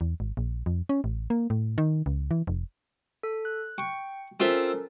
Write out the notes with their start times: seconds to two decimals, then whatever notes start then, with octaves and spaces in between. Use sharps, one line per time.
0.01 E2
0.20 G#1
0.37 A#1
0.66 F2
0.89 C#4
1.04 A1
1.30 A#3
1.50 A2
1.78 D#3
2.06 C#2
2.31 E3
2.47 F1
3.23 A4
3.45 F#6
3.78 G5 C#6
4.40 C4 C#4 F4 A4 A#4 E5